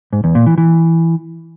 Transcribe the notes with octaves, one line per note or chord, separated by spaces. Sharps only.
G#2
E2
A#2
E3
E3